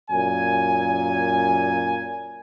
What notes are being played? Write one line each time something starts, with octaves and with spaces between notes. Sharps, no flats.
F#2 A#2 G#5